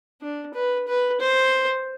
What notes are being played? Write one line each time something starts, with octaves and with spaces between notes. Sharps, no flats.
D4
B4
B4
C5